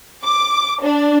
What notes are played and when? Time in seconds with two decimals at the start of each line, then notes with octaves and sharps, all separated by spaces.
0.23 D6
0.83 D4